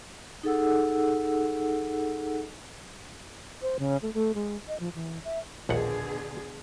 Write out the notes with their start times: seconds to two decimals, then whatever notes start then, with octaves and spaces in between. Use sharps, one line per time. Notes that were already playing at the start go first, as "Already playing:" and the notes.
0.43 D#4 G#4 A4 F#5 E6
3.62 C5
3.79 C#3
4.02 A3
4.14 A3
4.35 G#3
4.68 D#5
4.80 F3
4.95 E3
5.24 E5
5.69 A#1 D#2 B2 D3 G#4 F#5